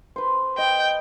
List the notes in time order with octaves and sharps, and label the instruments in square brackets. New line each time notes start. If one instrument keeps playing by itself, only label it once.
[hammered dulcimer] B4 C5
[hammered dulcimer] D#5 [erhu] G5